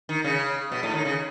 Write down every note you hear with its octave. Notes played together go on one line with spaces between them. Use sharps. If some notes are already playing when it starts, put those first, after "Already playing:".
D#3
C#3
B2
A2
D#3
C#3